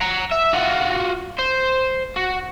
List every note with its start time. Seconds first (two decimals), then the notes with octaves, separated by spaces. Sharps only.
0.01 F#5 A#5
0.32 E5
0.54 F4 F#4
1.39 C5
2.17 F#4